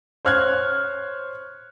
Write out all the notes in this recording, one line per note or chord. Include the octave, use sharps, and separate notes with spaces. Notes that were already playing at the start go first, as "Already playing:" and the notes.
C5 C#5 F6 F#6 G#6